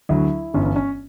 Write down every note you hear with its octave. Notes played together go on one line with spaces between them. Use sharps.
D2 D3 F#3 E4
G1 G2 E3 C#4
C#4
C#4